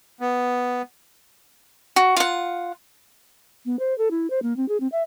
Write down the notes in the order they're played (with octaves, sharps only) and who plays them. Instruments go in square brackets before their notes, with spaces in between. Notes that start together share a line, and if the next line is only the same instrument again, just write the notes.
[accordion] B3
[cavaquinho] F#4
F4 F#5
[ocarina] B3
C5
A4
E4
C5
A#3
C4
G#4
C4
E5